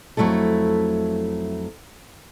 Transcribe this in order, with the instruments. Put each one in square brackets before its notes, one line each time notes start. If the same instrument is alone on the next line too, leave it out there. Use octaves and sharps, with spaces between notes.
[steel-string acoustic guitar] F2 F#3 A3 E4 A4